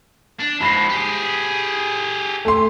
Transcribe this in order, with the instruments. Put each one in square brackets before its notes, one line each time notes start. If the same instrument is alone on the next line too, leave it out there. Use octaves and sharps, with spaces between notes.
[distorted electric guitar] D4
[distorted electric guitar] G#2 F3 [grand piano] B5 A#6 C7
[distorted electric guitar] G4 G#4
[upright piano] A3 C6